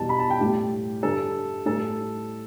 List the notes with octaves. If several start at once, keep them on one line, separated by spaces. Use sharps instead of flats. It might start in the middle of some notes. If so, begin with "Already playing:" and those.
Already playing: E2 B2 G3 A5
B5
A5
G5
A2 G3 G4
G2 D3 G3 A4
A2 G3 A4